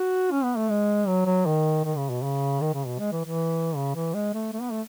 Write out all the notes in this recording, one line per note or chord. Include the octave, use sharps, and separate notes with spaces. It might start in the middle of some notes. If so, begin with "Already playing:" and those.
Already playing: F#4
C#4
B3
A3
G#3
F#3
F#3
D#3
D#3
C#3
B2
C#3
D#3
C#3
B2
G#3
E3
E3
C#3
E3
G#3
A3
A3
B3
A3